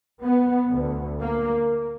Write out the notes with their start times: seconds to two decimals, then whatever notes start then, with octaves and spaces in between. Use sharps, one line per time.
0.23 B3
0.72 D2
1.21 A#3